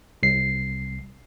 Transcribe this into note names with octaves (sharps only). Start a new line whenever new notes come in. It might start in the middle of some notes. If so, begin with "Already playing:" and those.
C2 C7